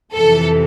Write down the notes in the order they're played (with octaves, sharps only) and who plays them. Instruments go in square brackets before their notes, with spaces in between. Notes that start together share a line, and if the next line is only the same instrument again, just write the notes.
[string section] F2 C3 E3 A4